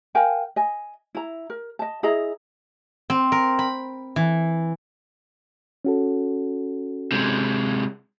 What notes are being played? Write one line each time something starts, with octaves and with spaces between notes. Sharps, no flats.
A#4 F5 G5 G#5
D#5 G#5
E4 A#5
A#4
D#5 A5
E4 G#4 D#5 A#5
C4
A#4
B5
E3
C#4 F#4 A4
C3 G#3